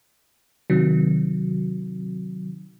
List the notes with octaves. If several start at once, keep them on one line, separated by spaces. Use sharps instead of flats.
C3 D#3 F#3